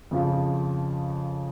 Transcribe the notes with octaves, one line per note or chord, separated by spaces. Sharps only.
F2 C#3 F3